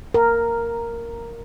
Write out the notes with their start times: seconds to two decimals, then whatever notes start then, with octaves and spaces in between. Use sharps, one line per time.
0.14 A#4